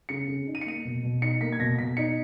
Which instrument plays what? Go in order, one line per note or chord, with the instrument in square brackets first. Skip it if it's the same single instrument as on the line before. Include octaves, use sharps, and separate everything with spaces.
[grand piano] C#3 C#7
C#3
D#4
D#7
C#7
A#3 D#7
B2
B2
D#4 C#7
A#3 B6
G#6
B2 A#6
B2 B6
D#4 C#7